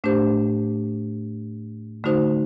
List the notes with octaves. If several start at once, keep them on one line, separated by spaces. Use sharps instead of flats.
A2 A3 D4 G4 C5
D3 A3 D#4 F#4 C5